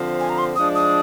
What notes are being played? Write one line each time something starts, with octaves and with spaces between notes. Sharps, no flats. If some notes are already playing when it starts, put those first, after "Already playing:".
Already playing: D3 F3 C4
G#5
A#5
C6
F3 G#3 D4 D#6
D#6